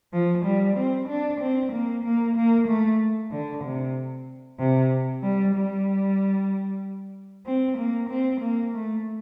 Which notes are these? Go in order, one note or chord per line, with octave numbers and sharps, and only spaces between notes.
F3
G3
C4
D4
C4
A#3
A#3
A#3
A3
D3
C3
C3
G3
G3
C4
A#3
C4
A#3
A3